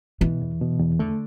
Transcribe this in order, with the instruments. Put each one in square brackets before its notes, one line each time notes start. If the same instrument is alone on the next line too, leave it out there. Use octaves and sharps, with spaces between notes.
[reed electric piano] B2 [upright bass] E3
[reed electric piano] E2
B2
E2
[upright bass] D3 [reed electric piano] A3